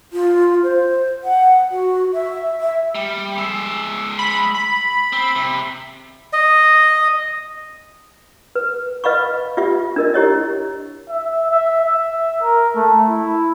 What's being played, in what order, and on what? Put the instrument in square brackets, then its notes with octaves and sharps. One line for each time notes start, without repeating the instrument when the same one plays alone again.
[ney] F4
C5
F#5
F#4
E5
E5
[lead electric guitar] G3
G#3 E5
[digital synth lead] B5
B5
[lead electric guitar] C4
C3
[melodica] D#5
[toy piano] B4
B4 D#5 F5 B5 C#6
F4 G4 E5
D4 A#4 D#5
E4 G4 C#5 D#5
[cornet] E5
E5
E5
A#4
A3
E4